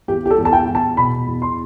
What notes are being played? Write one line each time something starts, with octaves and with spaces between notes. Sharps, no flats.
E2 G4
G4
A4
E2
A5
G5
E2
A5
B2 B5
E2
C6